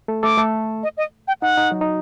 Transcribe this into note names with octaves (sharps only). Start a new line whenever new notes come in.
A3 A4
A3 A4 D6
A3 A4
D#5
D#5
G5
D#4 F#5
D#4
F#3 F#4
D#4